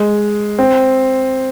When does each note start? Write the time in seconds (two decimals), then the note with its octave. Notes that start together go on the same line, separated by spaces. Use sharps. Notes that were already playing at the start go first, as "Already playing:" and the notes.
Already playing: G#3
0.59 C4